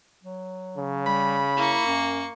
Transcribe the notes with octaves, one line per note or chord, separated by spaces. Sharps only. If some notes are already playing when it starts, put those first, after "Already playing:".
F#3
C#3
G3 B5
A#3 E4 C#6
F#2